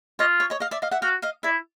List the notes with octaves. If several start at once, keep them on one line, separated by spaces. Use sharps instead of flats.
F4 C#5 D#5
C#5
C#5 D#5
D#5 F5
D5 E5
D#5 F5
E5 F#5
F#4 F5 G5
D#5 F5
E4 D5 E5